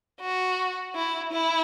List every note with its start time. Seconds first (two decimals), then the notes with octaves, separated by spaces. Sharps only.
0.20 F#4
0.95 E4
1.33 E4